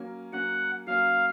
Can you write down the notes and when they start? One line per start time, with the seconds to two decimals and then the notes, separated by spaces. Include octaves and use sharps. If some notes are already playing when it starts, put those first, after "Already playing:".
Already playing: F#3 A#3 C#4
0.32 F#3 A#3 C#4 F#5
0.87 F#3 A#3 C#4 F5